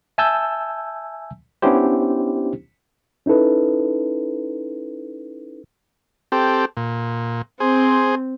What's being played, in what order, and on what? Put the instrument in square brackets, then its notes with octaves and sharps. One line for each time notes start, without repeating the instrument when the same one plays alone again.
[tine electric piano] E5 G#5 A5 E6 G6
B3 C#4 D4 E4 G4 C5
[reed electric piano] C#4 D#4 E4 A4 B4
[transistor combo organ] C4 G4 A4
A#2
[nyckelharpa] C4 [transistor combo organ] G#4 C5